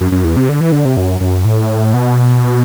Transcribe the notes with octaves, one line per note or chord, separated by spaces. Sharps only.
F#2
F#2
E2
C3
D3
E3
D3
C3
F#2
F#2
A2
B2